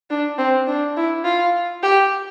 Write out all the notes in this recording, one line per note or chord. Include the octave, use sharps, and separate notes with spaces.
D4
C4
D4
E4
F4
G4